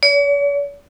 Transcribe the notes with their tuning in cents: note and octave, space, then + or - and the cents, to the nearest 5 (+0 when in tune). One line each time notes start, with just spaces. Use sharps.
C#5 +45